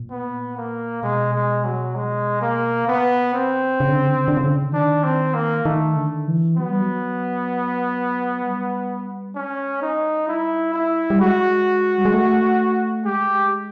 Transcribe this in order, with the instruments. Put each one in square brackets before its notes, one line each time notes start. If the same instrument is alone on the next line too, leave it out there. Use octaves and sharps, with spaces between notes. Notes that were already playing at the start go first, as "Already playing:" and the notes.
Already playing: [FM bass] A#2
[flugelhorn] B3
A#3
[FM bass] B2 [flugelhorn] G#3
[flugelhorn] G#3
F#3
G#3
A#3
[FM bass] D3
[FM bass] C#3 [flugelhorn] B3
[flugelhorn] C4
[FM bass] C#3
D3
C#3
D3
C#3
D3
C#3
D3
C#3
[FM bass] D#3 [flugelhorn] D4
[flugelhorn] C4
A#3
[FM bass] D#3 [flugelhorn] A3
[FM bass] D3
E3
[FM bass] F#3 [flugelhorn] B3
[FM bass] G3
F#3
G3
[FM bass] G#3 [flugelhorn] C#4
[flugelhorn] D#4
[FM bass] G3 [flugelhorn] E4
[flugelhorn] E4
[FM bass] G3
[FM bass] G#3 [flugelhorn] F#4
[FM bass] G3
G#3
A3
[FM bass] G#3 [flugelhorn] G4